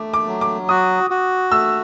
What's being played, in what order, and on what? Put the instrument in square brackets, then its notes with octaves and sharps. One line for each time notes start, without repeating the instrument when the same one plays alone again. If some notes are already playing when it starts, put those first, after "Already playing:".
Already playing: [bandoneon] A3 [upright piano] D6
[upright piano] D6
[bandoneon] F#3
[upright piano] D6
[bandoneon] F#4 [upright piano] D#6
[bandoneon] F#4
[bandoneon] A3 [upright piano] E6